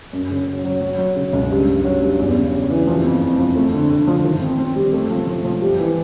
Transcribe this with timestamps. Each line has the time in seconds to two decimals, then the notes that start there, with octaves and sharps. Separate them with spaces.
0.13 F#2
0.30 C#3
0.47 F#3
0.65 F#3
0.81 F#3
0.99 F#3
1.16 C#3
1.33 C#2
1.51 G2
1.68 G2
1.84 F#3
2.02 G2
2.19 E2
2.36 C#3
2.53 C#3
2.70 E3
2.87 F3
3.04 F2
3.21 F2
3.39 F3
3.56 A3
3.73 D3
3.90 D3
4.07 F3
4.24 D#3
4.42 C4
4.59 C4
4.76 G3
4.93 A3
5.10 F3
5.27 F3
5.45 F3
5.62 G3
5.79 E3